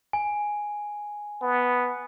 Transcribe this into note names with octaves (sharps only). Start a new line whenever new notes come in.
G#5
B3